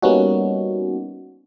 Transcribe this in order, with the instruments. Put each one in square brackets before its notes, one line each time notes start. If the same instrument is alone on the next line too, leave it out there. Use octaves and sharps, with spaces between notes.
[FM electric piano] G3 A#3 B3 C#4 D#4 F#4